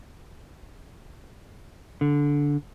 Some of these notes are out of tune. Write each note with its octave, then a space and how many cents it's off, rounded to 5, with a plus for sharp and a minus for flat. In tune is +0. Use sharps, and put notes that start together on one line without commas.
D3 -15